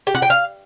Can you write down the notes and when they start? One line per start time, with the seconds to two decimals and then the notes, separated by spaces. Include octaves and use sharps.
0.07 G4
0.15 F#5
0.22 G5
0.30 F5